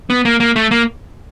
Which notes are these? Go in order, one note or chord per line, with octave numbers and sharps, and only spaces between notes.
B3
A#3
A#3
A3
A#3